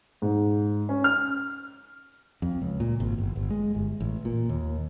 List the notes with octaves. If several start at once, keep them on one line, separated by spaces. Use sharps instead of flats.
G#2
C#4
F6
F2
C#2
A#2
G#1
G1
G1
G#3
G1
A1
A#2
D#2